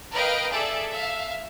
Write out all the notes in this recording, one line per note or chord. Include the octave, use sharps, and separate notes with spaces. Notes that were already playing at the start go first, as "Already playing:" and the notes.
A#4 B4 D#5 F5 G5 F6
G#4 A4 D5 E5
E5 F5